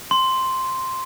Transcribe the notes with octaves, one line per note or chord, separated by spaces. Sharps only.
C6